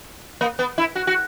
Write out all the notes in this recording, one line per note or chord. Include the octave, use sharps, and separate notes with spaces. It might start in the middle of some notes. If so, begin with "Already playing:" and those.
A#3
B3
E4
F#4
F#4